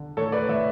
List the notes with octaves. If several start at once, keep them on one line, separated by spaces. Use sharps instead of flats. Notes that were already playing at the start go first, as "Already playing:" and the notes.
Already playing: D3
A2 A4 C#5
B4 D5
A2 C#5 E5